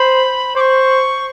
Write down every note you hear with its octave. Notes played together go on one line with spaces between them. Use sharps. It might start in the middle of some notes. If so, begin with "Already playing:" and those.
Already playing: C5 B5
C5 D6
C#6